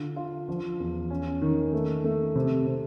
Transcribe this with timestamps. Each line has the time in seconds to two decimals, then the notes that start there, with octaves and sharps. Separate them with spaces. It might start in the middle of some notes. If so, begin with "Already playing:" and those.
Already playing: D3 F4
0.16 F4
0.48 F3
0.80 E2
1.10 C#4
1.42 D#3
1.73 A3
2.04 A3
2.35 C3
2.67 C3